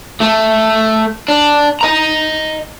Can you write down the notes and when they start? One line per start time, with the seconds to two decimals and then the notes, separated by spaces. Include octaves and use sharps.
0.21 A3
1.28 D4
1.81 D#5 A#5